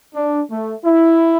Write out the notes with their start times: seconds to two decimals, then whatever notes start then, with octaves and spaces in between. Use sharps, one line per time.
0.15 D4
0.50 A3
0.84 E4